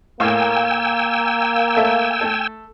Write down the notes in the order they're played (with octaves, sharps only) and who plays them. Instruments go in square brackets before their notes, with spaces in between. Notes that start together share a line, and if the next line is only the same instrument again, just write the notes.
[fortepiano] A2 F5 C#6 [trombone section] A#3 [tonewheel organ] G5 G#5 E6
[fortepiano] A3 A4 E5
A3 A4